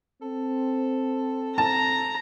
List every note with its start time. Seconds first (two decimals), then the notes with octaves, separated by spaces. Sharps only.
0.22 C4 A4
1.58 A5 A#5